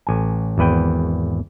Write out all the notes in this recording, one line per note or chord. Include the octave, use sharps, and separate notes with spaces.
A1 G#5
G#1 E2 B4 G5